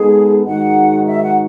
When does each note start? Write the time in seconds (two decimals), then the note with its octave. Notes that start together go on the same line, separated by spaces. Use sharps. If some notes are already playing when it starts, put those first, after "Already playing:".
Already playing: G#3 B3 D#4 G#4 A4
0.45 G#2 D#3 G#3 D#4 F#4 F#5
1.07 E5
1.23 F#5